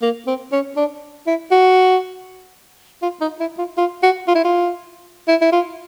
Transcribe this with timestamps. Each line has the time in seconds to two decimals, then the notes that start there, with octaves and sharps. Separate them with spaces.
0.02 A#3
0.27 C4
0.52 C#4
0.77 D4
1.27 E4
1.52 F#4
3.02 F4
3.21 D#4
3.40 E4
3.58 F4
3.77 F4
4.03 F#4
4.27 F4
4.35 E4
4.44 F4
5.28 E4
5.41 E4
5.52 F4